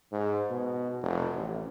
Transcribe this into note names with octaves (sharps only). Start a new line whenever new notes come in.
G#2
B2
F1
A1